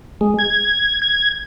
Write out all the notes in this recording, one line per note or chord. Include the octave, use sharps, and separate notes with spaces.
G#3
G#6
G#6